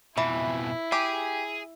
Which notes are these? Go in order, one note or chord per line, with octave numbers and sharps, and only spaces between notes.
F2 B2 E3 E4
G4 G#4